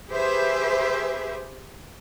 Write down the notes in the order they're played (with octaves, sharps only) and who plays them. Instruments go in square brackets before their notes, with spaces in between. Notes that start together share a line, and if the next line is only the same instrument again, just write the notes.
[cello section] G4 G#4 B4 C5 E5